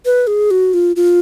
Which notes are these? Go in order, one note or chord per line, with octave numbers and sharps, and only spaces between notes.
B4
G#4
F#4
F4
F4